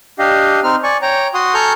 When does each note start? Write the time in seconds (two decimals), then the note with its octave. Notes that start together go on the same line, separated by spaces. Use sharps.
0.19 D4 G4 D#5 F5
0.64 C4 D#4 F6
0.83 D5 G#5 C#6
1.02 C#5 G5 A#5
1.34 F#4 F#5 C6 D#6
1.54 A4 G#5 A#5 C#6 F6 G6